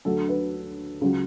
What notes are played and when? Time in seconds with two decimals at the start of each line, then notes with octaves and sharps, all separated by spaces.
0.05 D2 D3 F#3 A4
0.29 B4
1.01 C#2 C#3 F#3